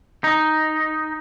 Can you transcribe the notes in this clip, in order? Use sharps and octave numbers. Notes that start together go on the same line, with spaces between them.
D#4